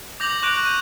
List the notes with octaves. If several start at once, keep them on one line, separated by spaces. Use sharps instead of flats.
D6 G6 A#6 F7 F#7
C#6 D6 F#6 G6 A#6 D7
G6 D#7